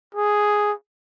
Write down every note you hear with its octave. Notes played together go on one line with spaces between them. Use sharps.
G#4